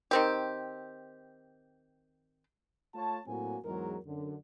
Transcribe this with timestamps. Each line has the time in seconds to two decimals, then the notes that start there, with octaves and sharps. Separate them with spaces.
0.11 D#3 C4 G4
2.94 A3 F4 C#5 A5
3.27 A2 F#3 A#3 C4 F#4 G#5
3.65 E2 G#2 F#3 G#3 A#4
4.06 F#2 D3